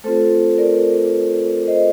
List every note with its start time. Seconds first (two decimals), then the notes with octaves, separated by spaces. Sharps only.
0.04 A3 C4 F4 A4 C5
0.58 A#4 D5
1.67 C5 D#5